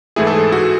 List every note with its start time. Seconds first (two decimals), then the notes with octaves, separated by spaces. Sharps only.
0.16 G#2 E3 A3 E4 G#4
0.27 A4
0.36 G#4
0.52 F#4